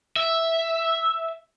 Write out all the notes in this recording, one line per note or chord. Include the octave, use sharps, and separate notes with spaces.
E5